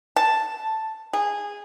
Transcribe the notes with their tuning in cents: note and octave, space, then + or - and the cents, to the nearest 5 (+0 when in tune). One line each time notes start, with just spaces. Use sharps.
A5 +0
G#4 -15